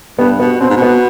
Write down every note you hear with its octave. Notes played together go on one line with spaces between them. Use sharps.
G2 B3
B2 B3
B2 C4
G#2
B2 B3